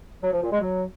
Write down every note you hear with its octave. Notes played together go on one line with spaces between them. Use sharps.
F#3
F3
A#2
G#3
F#3